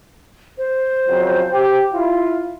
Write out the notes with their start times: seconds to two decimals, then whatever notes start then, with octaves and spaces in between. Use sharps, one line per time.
0.58 C5
1.07 F2 C#3 F#3
1.51 G4
1.93 E4 F4